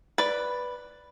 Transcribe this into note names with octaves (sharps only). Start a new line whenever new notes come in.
B4 D5